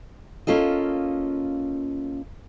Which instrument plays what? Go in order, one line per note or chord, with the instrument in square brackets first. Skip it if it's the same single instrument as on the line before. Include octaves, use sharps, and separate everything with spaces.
[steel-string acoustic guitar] A#3 C#4 F4 A4 D#5